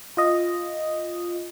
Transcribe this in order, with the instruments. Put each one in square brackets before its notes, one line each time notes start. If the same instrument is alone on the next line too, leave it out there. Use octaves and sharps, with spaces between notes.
[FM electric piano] F4 D#5